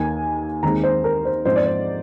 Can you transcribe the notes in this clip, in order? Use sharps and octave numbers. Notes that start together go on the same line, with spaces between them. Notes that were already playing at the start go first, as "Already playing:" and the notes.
Already playing: D#2 D#3 A#3 G#5
D#2 D#3 G#3 C4 D#4 A#5
C5
A#4
C5
G#2 F3 C4 D#4 C5
D5
C5